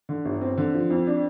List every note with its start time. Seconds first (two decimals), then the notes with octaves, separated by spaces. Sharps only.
0.09 D3
0.25 G1
0.41 C4
0.57 D3
0.74 F3
0.90 F2
1.07 D4